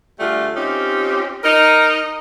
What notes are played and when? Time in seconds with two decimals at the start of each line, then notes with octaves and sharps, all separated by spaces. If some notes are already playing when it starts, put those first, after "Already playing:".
0.20 D3 G3 A3 F4 G#4
0.55 C4 C#4 D#4 F4 G4
1.44 D#4 A#4 D#5